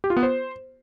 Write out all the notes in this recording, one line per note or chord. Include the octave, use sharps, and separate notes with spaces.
G4
F4
B3
C5